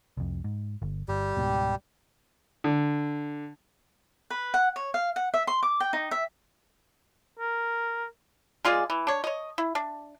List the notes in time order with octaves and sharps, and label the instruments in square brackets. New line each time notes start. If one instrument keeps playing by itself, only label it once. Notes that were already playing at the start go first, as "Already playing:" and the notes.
[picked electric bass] C2 F2
G#2
G1
[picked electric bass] G1 [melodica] G3 G4
[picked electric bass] C#2 G#2 B2
[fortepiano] D3
[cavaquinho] B4
F#5
C#5
F5
F#5
E5
C6
D6
G5
D#4
E5
[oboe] A#4
[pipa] G#3 F4 G#4 D5
E3
D4 C#5
C#5 D#5
E4
D4